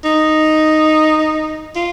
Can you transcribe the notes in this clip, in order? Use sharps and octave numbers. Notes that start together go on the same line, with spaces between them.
D#4
F4